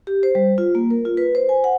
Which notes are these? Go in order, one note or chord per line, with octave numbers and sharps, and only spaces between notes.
G4
C5
G3
F4
A#3
A#4
F4
B4
C5
G#5
F#5